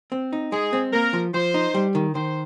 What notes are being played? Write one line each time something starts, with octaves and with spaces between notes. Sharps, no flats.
C4
D#4
G#3 G#4
C4
A#3 A#4
F3
F3 C5
D#4
G3
D#3
D#3 C5